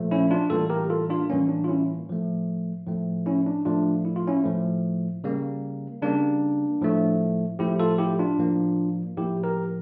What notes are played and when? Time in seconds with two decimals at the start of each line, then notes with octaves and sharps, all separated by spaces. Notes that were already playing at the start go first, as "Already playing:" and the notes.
Already playing: A#2 F3 A3
0.11 C#4 E4
0.31 D4 F4
0.50 A2 E3 G3 A#3 F4 A4
0.70 G4 A#4
0.90 F4 A4
1.10 D4 F4
1.30 A2 E3 G3 A#3 C#4
1.49 D4
1.64 F4
1.68 C#4 E4
2.09 A2 F3 A3
2.87 A2 F3 A3
3.26 C#4 E4
3.47 D4
3.65 A2 F3 A3 D4 F4
4.05 E4
4.16 F4
4.27 C#4 E4
4.44 A2 F3 A3
5.24 C#3 G3 A#3
6.02 C#3 G3 A#3 D4
6.81 A2 F3 A3
7.59 A2 F3 A3 E4 G4
7.79 F4 A4
7.98 E4 G4
8.19 D4 F4
8.38 A2 F3 A#3
9.17 A2 F3 A#3 E4 G4
9.43 G4 A#4